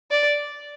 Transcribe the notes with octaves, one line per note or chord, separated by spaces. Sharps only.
D5